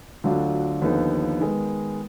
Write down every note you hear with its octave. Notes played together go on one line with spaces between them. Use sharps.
D2 D3 F#3 D4 F4
D#2 D3 F3 B3 D#4
D#3 G#3 B3